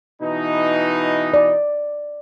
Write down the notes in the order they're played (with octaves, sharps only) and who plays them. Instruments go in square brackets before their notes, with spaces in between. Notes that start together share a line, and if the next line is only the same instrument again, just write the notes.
[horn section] B2 E3 D#4
[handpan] D5